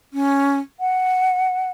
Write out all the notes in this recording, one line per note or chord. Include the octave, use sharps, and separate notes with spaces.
C#4
F#5